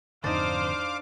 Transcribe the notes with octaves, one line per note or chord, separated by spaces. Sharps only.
F2 G#2 D3 D4 D#4 C5 F5 D6